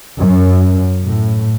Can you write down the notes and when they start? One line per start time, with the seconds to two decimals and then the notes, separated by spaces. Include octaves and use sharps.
0.18 F#2
1.03 A2